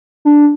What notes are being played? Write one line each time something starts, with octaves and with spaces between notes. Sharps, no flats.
D4